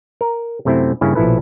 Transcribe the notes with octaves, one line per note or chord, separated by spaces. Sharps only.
A#4
F#2 C3 A3 C4 E4
G2 C#3 A#3 C#4 E4
A#1 B2 F3 E4 A4 B4